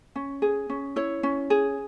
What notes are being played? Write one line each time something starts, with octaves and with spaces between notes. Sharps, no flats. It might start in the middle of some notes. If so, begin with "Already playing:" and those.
C#4
G#4
C#4
E4 C#5
C#4
G#4